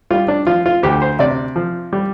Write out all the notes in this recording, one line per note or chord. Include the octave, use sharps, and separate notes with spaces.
G3 F4
D4
F3 F4
F4
D2 G4
C5
C3 D5
F3
G3